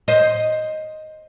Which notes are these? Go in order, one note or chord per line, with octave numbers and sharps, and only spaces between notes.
C5 D#5